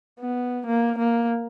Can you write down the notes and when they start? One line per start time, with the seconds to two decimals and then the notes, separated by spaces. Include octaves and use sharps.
0.20 B3
0.67 A#3
0.99 A#3